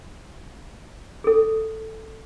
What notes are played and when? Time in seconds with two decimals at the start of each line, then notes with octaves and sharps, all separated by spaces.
1.24 G#4 A4